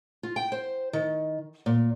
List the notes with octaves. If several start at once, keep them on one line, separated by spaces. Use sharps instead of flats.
F4
G5
C5
D#3
A#2